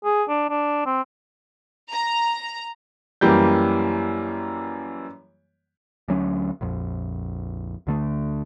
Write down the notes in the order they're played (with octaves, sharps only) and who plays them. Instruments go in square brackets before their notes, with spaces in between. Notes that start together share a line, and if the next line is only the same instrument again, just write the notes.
[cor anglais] G#4
D4
D4
C4
[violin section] A#5
[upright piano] F#2 E3 G3 A#3 G6
[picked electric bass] D2 F#3 C#4
A#1 F2
D2 D3 A3